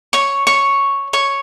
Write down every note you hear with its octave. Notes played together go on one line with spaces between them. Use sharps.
C#5 C#6
C#5 C#6
C#5 C#6